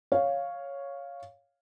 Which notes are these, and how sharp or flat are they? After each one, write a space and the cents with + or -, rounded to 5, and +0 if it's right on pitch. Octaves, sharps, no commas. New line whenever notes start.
C#5 +0 F5 +0